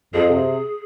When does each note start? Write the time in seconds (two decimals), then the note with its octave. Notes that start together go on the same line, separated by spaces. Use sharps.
0.14 F2 G#4
0.30 C3